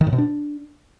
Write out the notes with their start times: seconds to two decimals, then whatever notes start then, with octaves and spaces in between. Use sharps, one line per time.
0.01 D#3
0.07 A2
0.13 B2
0.18 D4